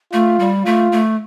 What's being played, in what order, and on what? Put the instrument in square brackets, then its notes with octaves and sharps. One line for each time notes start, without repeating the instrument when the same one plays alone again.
[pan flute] A3 [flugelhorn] F4
[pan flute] G3
[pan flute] A3 [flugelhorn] F4
[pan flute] A3